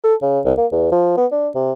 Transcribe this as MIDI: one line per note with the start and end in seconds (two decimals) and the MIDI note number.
0.04 0.15 69
0.22 0.40 49
0.45 0.53 36
0.58 0.67 58
0.72 0.91 40
0.92 1.15 53
1.17 1.26 59
1.32 1.49 62
1.55 1.72 48